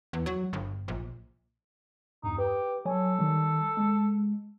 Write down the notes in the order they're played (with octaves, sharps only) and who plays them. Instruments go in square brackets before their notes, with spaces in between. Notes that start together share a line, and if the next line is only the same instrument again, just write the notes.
[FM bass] E2
F#3
G1
A#1
[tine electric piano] E2 G2 [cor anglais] D#4
[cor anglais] G4 [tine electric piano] B4
[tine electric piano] F#3 C#5 G#5 [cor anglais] A4
[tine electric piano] D#3 G3
G#3